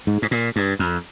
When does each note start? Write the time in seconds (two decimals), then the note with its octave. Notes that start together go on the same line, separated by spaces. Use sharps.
0.07 G#2
0.22 G#2
0.31 A#2
0.56 G2
0.79 F2